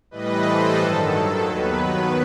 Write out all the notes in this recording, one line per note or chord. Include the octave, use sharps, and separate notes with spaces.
A2 E3 G3 B4 D#5
A4 C5
G2 D#3 F#3 A4
D#2 D#3 F#3 B3 B4